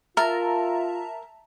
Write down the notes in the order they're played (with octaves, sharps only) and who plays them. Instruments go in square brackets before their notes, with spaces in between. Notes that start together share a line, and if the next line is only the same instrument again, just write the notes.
[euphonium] F4 [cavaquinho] A#4 [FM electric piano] E5 A5 A#5